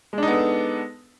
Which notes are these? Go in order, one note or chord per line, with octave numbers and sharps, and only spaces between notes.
G#3 B3 D4 D#4 A4